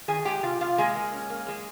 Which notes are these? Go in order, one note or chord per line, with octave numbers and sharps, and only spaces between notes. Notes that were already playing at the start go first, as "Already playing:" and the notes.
D#3 G#4 G#5
G#3 G4 G5
C3 F4 F5
C3 F4 F5
G#3 A#3 G#4
A#3
C#4
A#3
G#3